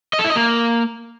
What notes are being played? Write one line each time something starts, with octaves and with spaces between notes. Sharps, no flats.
D#5
A4
E4
D#5
A#3